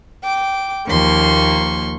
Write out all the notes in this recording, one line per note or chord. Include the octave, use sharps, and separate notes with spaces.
G5 D6
D#2 F3 A#3 C6 C#6